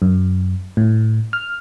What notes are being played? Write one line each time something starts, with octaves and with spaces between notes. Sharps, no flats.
F#2
A2
F6